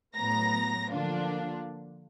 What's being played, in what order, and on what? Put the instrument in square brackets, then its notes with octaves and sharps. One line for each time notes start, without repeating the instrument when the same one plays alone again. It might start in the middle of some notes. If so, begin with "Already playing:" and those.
[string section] A2 F#3 B3 A#5 A#6
D3 F3 A#3 D4 F4